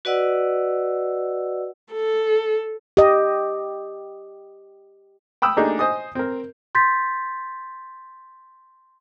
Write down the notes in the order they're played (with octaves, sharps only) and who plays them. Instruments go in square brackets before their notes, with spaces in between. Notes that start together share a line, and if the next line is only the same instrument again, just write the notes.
[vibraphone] F#4 B4 D5 D#5 F#5 E6
[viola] A4
[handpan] G4 D#5
[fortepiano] G5 B5 D#6 E6
A3 A#3 D4 D#4 G4 G#4
C5 D#5 G#5 D#6
C4 A#4
[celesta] C6 G6 A6 B6